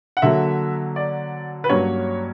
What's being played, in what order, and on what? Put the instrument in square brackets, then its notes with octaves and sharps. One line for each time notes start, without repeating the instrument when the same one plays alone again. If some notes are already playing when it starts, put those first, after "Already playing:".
[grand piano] F#5
D3 F#3 A#3 E5
D5
B4
G2 F#3 A#3 C#4 C#5